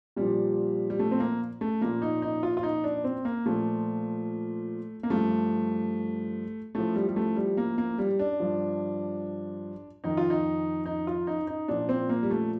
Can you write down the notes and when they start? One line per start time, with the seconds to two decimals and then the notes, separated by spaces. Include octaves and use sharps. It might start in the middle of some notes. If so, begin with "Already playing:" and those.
0.16 A#2 F3 G3
0.90 G3
0.99 A3
1.11 C4
1.20 A#3
1.61 A3
1.81 A#2 F3 A#3
2.02 D#4
2.22 D#4
2.43 F4
2.57 F4
2.63 D#4
2.84 D4
3.04 C4
3.25 A#3
3.46 A#2 F3 A3
5.03 A#3
5.10 G2 F3 A3
6.75 A2 F3 A3
6.96 G3
7.08 G3
7.16 A3
7.36 G3
7.57 A#3
7.78 A#3
7.98 G3
8.19 D4
8.40 G2 F3
10.04 F2 D#3 D#4
10.17 F4
10.30 D#4
10.86 D#4
11.07 F4
11.27 D#4
11.47 D#4
11.68 A#2 F3 D4
11.89 C4
12.09 A#3
12.23 G3
12.30 A3